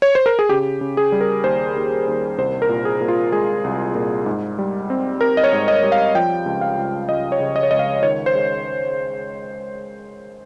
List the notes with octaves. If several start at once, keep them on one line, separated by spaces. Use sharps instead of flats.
C#5
C5
A#4
G#4
C#3 G4
C#3
G#4
G3
A#4
D#2 C5
D#2
D#2
C2 C5
A#4
A#2
G#4
A#2
F4
G#3 G#4
C2
A#2
G#2
G3
C4
C4 A#4
D#5
C#5
G#2
D#5
G3
F5
F3 G5
C#2
F5
C#2
C#2 D#5
C#5
C#3
D#5
C#5
C#2 D#5
F5
D#3 C#5
C5
G#3